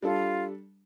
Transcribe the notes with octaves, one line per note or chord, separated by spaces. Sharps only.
G3 D4 F4 A4